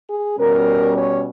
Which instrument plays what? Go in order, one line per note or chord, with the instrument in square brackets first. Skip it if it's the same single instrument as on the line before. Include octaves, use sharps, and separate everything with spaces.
[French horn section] G#4
B2 G3 C#4 A#4
C#5